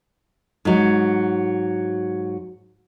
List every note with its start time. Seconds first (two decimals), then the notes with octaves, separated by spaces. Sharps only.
0.65 G#2 F#3